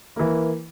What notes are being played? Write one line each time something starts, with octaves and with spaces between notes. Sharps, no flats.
E3 A#3